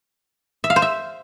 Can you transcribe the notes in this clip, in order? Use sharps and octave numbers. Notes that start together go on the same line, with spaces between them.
E5
F5
C5
E5